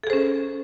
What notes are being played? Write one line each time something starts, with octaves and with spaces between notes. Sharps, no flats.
C#4 G#4 A4 C5